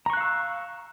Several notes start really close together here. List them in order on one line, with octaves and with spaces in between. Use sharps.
A#5 C#6 F#6 F5 E6